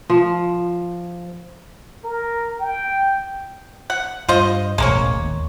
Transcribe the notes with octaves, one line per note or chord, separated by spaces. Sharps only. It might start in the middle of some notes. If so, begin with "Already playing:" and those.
F3
A#4
G5
F#5
G2 F4 C5 D#5
E1 A1 G#3 A#3 C#5
D#2